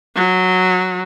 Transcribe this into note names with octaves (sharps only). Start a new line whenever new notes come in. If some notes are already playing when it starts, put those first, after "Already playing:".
F#3